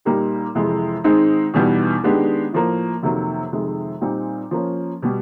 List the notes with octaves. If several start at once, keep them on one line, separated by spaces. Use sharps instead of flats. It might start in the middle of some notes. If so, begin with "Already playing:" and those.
A#2 G3 A#3 D#4 G4
F2 C3 E3 G#3
G#2 D#3 G#3 C4 D#4
E2 B2 G3 B3 D#4
D#3 G#3 B3 D4 G4
A2 F3 A#3
F2 C3 D#3 F#3 A#3
F2 C3 D#3 G#3
A#2 G3 C4 D#4
F3 A#3 C#4
B2 G3